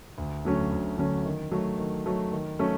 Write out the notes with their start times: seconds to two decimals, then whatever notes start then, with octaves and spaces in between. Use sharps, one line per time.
0.18 D2
0.45 D3 F#3 A3 C#4
0.72 D2
0.98 D3 F#3 A3 C#4
1.26 D#3
1.51 F#3 A3
1.78 D#3
2.06 F#3 A3
2.32 D#3
2.59 F#3 A3 C#4